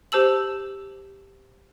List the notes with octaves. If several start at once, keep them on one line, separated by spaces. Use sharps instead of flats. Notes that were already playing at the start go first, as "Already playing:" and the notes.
G4 C5 A5 E6 F#7